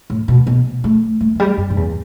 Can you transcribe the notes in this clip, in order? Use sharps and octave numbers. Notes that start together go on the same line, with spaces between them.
A2
B2
B2
A3
A3
E3
G3
G2
G2
E2